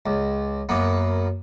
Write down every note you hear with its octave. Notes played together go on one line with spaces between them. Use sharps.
C#2
F#2 A#3 B3